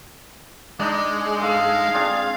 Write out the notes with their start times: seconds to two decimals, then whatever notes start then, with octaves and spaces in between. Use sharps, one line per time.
0.80 G#3 D4 D#4 D6
1.42 G#2 A4 F5
1.94 C4 D4 F4 G#4